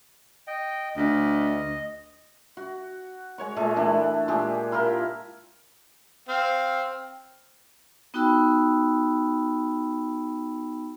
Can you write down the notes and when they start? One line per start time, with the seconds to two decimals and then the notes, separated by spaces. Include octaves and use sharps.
0.47 D#5 G5
0.97 D2 D#5
2.57 F#4
3.38 G#3 C#5 C#6
3.56 A#2 G#3 A4 D#5
3.76 E3 A3 D4
4.28 A#2 G#3 G4 G#4
4.72 E4 F4 G4 A#4
6.28 C4 F5 G5
8.14 B3 D#4 F#4 G5 B5 E6